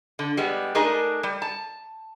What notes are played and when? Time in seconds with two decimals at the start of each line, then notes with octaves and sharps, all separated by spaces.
0.19 D3
0.37 G3 G#3 B3
0.75 A3 D4 D#4 G#4 A#4
1.23 G3
1.42 A5